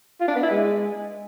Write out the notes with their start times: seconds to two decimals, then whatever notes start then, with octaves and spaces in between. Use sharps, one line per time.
0.21 F4
0.28 D4
0.36 B3
0.43 E4
0.51 G#3